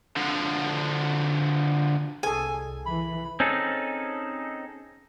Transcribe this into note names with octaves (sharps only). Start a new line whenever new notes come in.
D3 F3
C2 G#4 A4 G#5
E3 B5
C4 C#4 D#4 G#4 A4